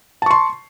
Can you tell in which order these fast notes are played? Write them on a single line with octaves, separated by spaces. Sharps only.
A5 C#6 C6